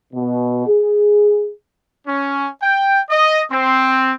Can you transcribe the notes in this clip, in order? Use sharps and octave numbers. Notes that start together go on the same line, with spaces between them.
B2
G#4
C#4
G5
D#5
C4